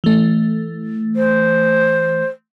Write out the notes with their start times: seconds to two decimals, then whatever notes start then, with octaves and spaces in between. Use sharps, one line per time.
0.04 E3 A3
1.16 C5